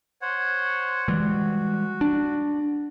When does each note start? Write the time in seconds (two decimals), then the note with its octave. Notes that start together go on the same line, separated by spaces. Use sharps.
0.22 C5 C#5 F#5
1.08 E3 G3 G#3 F#4
2.01 D4